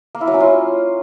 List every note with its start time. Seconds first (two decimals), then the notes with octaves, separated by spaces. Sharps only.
0.15 A#3
0.21 E4
0.27 F#3
0.34 C#4
0.40 F4